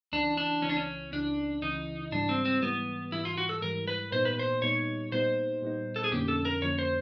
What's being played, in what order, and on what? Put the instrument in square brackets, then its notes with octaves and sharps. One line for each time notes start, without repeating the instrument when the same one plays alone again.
[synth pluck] C#2 C#3 E3 [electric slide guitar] D4
[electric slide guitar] D4
[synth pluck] C#2 C#3 E3 [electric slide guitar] C#4
[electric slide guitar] D4
C#4
[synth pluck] C#2 C#3 E3 [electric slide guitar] D4
[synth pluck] C#2 C#3 E3 [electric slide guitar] D#4
[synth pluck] G#2 E3 G3 [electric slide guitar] D4
[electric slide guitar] C4
C4
[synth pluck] G#2 E3 G3 [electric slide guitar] B3
[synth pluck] G#2 E3 G3 [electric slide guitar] E4
[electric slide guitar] F4
F#4
A4
[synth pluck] G#2 E3 G3 [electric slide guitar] A#4
[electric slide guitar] B4
[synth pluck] A#2 G3 B3 D#4 [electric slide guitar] C5
[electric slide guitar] B4
C5
[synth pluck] A#2 G3 B3 D#4 [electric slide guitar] C#5
[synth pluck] A#2 G3 B3 D#4 [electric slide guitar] C5
[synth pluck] A#2 G3 B3 D#4
[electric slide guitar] A4
G#4
[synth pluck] F2 D3 F3 A#3 C#4 [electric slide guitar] G4
[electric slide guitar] A4
A#4
[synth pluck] F2 D3 F3 A#3 C#4 [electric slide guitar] C#5
[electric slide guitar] C5